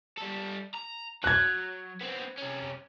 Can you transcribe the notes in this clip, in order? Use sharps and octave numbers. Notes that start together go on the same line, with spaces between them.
G3 A4
A#5
F#3 F#6 G#6
B3 C4
C3 C#4